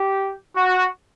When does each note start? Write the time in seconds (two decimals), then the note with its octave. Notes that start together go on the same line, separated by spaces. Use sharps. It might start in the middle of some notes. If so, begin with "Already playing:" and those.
Already playing: G4
0.56 F#4